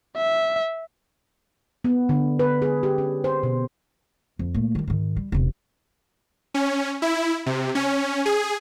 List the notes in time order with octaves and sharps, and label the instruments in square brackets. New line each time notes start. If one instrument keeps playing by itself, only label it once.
[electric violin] E5
[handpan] B3
D3
B4
G#4
G4
C#4
C5
B2
[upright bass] F2
A#2 A3
D#3 G3
G#2 D#3
G3
E1 C3
[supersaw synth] C#4
E4
C3
C#4
G#4